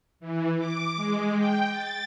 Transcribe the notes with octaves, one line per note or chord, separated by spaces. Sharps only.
E3
D6
G#3
G5
A6